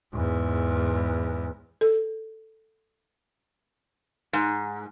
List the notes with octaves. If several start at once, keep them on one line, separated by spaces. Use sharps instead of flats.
E2 G#2
A4
G#2